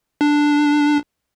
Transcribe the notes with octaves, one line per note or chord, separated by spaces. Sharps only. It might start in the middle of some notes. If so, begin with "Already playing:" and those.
D4